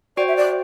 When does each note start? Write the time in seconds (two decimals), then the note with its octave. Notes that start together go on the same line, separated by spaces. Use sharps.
0.17 F#4 C5 D5 G5
0.28 E5
0.37 D5